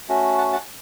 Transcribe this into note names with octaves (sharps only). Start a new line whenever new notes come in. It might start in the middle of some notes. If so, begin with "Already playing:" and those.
A3 C#4 F#4
F#5 A5
F#5 A5